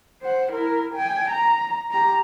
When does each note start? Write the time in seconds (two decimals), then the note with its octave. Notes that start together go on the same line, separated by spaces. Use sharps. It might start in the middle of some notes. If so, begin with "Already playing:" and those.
0.22 C5 F#5
0.52 E4 A#4
0.95 G5 G#5
1.31 A#5
1.91 G4 A#5